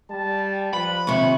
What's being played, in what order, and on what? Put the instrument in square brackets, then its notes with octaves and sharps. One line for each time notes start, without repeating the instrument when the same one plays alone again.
[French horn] G3 [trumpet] A5
[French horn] F3 [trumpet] B4 [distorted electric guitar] B5
[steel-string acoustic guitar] D#2 C3 [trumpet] C#6